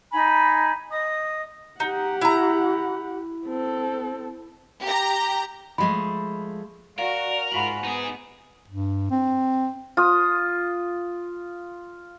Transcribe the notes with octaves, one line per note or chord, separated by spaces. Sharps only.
D#4 G#5 B5
D#5 D#6
D#4 G4 F#5
E4 A#5
C4 A4
G4 A#5
F3 G#3 A3 B5
F#4 A#4 D5 F5
G#2 F4 F#4 G#5 B5 B6 F#7
B3 D#4 G#4
G2
C4
F4 D#6